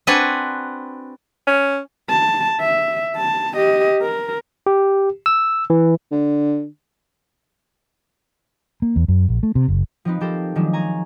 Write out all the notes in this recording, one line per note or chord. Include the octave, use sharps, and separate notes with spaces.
C4 D4 F#4 B4 F#5 G#5
C#4
A5
E5
A5
G4 D#5
A#4
G4
E6
E3
D3
A#3
E2
F#2
A#1
A3
C3
F#1
F3 C4 D#4 B4
F3 G4 A4 A#4 C5
D#3 F3 F#3 G#3 A3 D4
G#5 A#5 C#6